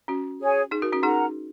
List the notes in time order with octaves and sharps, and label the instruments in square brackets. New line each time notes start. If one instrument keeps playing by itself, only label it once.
[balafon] C#4 F#4
[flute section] G#4 C#5 G#5
[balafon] D#4 G#4
F#4 A#4
C#4 F#4
[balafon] D#4 G#4 [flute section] A#4 F#5 A#5